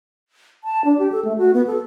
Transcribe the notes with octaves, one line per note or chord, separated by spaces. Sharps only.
A5
D4
G4
A4
A3
F#4
B3
A4